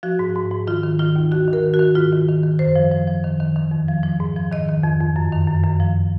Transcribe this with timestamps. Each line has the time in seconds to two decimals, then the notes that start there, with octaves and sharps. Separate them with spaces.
0.03 F3 F#4
0.19 G#2
0.36 G#2
0.51 G#2
0.67 D#3 F4
0.83 D#3
0.99 D#3 F4
1.16 D#2
1.32 D#3 F#4
1.48 D#3
1.53 A#4
1.63 D#3
1.74 F#4
1.79 D#3
1.95 G#2 F4
2.12 D#3
2.28 D#3
2.43 D#3
2.59 F#2 C5
2.76 F3
2.92 F3
3.08 F3
3.24 D#3
3.40 D#3
3.56 D#3
3.71 F2
3.88 F3
4.03 F3
4.20 G#2
4.37 F3
4.52 D#3 D#5
4.68 D#3
4.84 F2
5.01 F2
5.16 F#2
5.32 D#3
5.48 F#2
5.64 F#2
5.80 F3